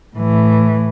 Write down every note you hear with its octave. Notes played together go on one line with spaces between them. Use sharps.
A2 E3